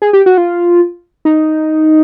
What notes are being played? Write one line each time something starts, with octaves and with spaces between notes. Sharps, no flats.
G#4
G4
F#4
F4
D#4